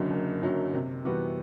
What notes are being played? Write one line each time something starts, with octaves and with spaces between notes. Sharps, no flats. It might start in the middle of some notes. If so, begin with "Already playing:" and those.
Already playing: F#1 F#2 D3 F#3
F#1
F#2 D3 F#3
C3
E3 G3 B3 F#4